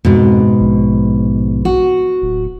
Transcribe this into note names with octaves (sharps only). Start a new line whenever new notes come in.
F2 G#2 B2
A#1
F#4
D1